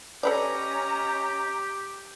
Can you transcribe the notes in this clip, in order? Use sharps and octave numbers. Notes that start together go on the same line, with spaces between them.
C#4 G4 A4 B4 D5 D#5 A#5